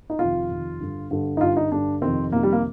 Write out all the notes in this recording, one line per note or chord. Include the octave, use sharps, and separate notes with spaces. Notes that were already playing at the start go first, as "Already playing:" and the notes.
D#4
F2 C3 D#3 F4
F2 C3 D#3
G2 D3
G2 D3
D#4
G2 D3 F4
D#4
G2 D3 D4
F2 C3 D#3 C4
F2 C3 D#3 A#3
G3
A#3